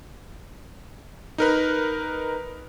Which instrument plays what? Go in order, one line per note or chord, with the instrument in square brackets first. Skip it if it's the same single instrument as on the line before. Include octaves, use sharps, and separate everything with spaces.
[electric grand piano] D#4 A#4 B4